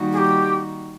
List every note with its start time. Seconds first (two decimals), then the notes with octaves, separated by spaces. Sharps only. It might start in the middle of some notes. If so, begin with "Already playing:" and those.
Already playing: D#3 G3 A#3 D#4 F#4
0.12 G#4
0.17 G4